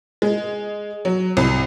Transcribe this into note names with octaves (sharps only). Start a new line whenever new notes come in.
G#3
F#3
C2